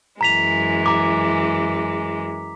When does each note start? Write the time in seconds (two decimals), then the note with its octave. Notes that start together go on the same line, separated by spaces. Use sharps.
0.21 F#2 E3 G#3 A#5 B6 F7
0.86 A#5 D6